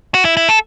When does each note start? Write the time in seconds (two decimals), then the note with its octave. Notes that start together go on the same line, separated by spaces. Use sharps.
0.14 F#4
0.25 E4
0.37 E4
0.49 A4